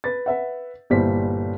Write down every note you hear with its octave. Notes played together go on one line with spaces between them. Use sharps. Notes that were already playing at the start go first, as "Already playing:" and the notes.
B4 A6
B4 E5 F#5
G1 A#2 G3 E4 C5 B6